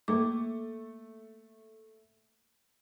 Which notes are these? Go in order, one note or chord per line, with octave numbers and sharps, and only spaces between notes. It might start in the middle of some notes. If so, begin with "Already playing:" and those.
A3 A#3 D6